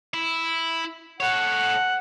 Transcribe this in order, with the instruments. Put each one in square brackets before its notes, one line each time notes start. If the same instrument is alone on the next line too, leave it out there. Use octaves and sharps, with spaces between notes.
[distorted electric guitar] E4
[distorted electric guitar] A4 C#5 [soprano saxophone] F#5